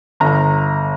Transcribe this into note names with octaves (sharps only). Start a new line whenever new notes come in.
G1 A#5